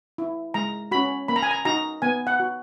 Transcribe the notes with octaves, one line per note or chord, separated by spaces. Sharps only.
E4
G#3 A#5
C#4 F#4 B5
A#3 B5
A#5
G#5
A#5
D#4 F#4 A#5
B3 G#5
F#5
F#4